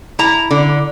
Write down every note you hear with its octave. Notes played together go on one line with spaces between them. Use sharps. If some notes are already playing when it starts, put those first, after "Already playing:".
E4 A#5
D3